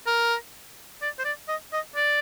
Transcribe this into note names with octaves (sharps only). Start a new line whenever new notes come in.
A#4
D5
C5
D5
D#5
D#5
D5